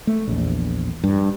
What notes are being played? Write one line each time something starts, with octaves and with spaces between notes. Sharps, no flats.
A3
A#1 E2
G2